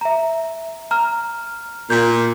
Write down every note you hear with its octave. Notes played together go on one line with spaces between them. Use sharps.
E5 A#5
A#5 F6
A#2 G6